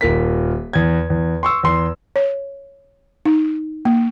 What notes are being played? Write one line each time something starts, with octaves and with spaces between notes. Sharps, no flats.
D#1 A#4 B6
E2 G#6
E2
C6 C#6 E6
E2 C6
C#5
D#4
A#3